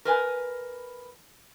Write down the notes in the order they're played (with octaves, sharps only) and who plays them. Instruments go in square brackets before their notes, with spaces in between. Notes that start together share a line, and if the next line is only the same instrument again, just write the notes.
[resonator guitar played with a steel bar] A#4 B4 G#5